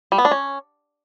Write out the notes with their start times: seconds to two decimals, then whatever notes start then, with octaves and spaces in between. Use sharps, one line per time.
0.12 G3
0.18 B3
0.25 D4
0.31 C#4